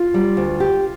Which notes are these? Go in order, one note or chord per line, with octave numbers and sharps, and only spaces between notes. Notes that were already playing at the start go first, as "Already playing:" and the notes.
Already playing: F4
G3
D2
G4